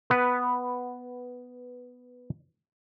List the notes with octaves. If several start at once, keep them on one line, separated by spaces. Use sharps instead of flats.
B3 B4